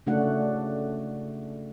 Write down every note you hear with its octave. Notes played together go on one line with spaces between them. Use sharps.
C#3 A3 D4 F#4 F#5